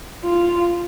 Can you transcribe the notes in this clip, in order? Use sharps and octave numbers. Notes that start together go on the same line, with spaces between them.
F4